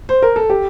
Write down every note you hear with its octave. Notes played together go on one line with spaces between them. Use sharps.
C5
A#4
A4
G4